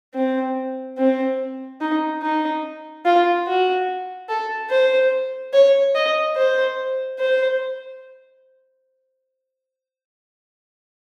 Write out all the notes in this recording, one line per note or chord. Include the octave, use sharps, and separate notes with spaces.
C4
C4
D#4
D#4
F4
F#4
A4
C5
C#5
D#5
C5
C5